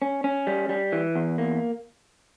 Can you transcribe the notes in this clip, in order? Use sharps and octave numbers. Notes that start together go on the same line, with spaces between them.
C#4
C#4
G3
G3
E3
E2
A#3